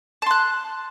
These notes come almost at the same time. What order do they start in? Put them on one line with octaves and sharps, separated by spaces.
A5 C6 F#6